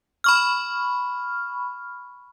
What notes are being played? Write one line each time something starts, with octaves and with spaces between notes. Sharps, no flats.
B5 C#6 F6